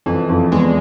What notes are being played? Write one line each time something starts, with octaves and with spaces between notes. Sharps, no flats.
F2 E3
F2
E2 G#3